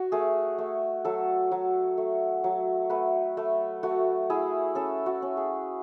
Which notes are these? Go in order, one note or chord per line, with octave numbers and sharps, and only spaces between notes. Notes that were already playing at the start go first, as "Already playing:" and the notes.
Already playing: F#4
A3 G#4
A3
F#3 A4
F#3
A3
F#3
A3 B4
A3
A3 F#4
E4 G#4
C#4 A4
F#4
C#4
G#4